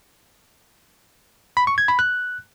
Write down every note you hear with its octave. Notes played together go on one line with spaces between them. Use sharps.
B5
C#6
G#6
B5
F#6